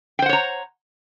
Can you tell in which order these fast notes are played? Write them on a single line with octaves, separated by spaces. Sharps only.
G5 C5 F#5 C#5 A#5